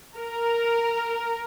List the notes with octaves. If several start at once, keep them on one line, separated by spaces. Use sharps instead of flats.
A#4